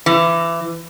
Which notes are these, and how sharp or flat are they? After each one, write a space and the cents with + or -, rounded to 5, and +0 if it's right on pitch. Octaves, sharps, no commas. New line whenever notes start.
E3 +25